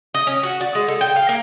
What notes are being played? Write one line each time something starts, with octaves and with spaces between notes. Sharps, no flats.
D#5
C#4
F#4
D5
G#3
A4
G5
F5
A#3